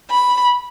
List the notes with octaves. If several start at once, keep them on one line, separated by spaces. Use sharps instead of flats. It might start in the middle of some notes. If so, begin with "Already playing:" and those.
B5